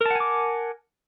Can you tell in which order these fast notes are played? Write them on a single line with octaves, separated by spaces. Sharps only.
A#4 A5 F#5 G#5 D6